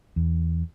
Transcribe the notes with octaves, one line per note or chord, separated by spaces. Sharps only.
E2